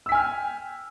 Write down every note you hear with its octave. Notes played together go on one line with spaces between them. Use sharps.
G5 G#5 E6 F6 B6